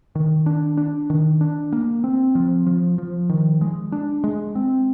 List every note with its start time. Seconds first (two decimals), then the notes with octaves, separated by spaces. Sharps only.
0.15 D#3
0.46 D4
0.77 D4
1.10 D#3
1.41 D4
1.72 A#3
2.04 C4
2.35 F3
2.66 F3
2.98 F3
3.29 D#3
3.61 G#3
3.92 D4
4.24 G#3
4.55 C4